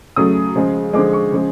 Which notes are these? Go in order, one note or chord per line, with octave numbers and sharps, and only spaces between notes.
C#3 F#3 A3 D#6
C#3 F3 G#3
D3 F3 G#3 D6
C#6
C#3 F3 G#3